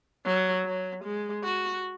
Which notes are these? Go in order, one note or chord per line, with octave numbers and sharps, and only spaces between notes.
F#3
F#3
G#3
F#4